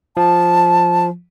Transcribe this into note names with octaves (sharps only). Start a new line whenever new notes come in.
F3 A5